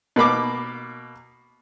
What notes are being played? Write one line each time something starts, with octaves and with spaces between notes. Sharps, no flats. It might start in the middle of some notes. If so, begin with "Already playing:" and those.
B2 A#3 B5 D6